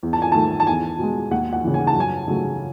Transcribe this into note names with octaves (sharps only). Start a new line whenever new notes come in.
E2
A5
G#5
D#3 A3 A5
A5
E2 G#5
B2 G#3
D#2 F#5
F#5
C#3 E3
G#5
A5
F#2 G#5
C#3 F#3 A3